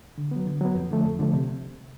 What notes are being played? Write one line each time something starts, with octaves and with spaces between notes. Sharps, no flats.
D3
F#3 B3
D3
F#3 B3
F2
D3 F3 A3
F2
D3 F3 A3
C3